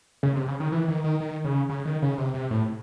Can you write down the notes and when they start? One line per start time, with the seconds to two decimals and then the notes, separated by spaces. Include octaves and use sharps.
0.23 C#3
0.35 C3
0.48 C#3
0.60 D#3
0.72 E3
0.88 D#3
1.04 D#3
1.20 D#3
1.45 C#3
1.69 C#3
1.85 D#3
2.02 C#3
2.18 C3
2.34 C3
2.51 A2